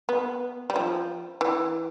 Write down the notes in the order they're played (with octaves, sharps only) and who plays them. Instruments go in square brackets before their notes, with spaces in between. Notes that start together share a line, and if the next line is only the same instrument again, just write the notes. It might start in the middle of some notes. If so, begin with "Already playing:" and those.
[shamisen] B3
G3
F3
E3